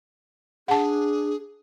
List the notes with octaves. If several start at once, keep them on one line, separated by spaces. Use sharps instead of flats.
D4 G#4 F#5 A5